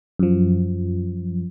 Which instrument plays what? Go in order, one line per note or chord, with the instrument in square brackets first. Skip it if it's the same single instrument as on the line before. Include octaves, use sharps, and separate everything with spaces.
[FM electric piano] F#2 F3